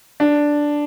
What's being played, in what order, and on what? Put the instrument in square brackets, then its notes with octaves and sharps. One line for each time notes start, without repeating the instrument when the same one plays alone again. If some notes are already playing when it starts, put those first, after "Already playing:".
[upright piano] D4